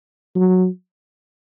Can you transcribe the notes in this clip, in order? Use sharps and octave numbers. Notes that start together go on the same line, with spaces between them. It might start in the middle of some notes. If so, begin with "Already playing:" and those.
F#3